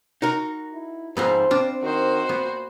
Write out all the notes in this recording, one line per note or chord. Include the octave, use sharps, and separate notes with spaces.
D#4 F#4 A#4
E4
F2 G#2 F3 B3 C4 D#4 C5
C4 D4 F4
D#3 F#4 C5
A#2 B3